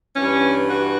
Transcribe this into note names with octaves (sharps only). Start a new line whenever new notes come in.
G2 E3 C#4
F#4